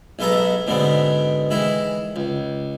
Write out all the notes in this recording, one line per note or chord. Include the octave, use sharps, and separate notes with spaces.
B1 G#3 B3 A4 A5 A#5
G#2 B2 D3 G#3 B3 C4
D#3 E3 G#3 E4
C#2